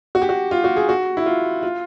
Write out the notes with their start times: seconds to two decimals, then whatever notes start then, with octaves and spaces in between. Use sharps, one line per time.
0.15 F#4
0.22 G4
0.29 F#4
0.51 F4
0.64 F#4
0.77 G#4
0.89 F#4
1.17 E4
1.26 F4
1.63 F4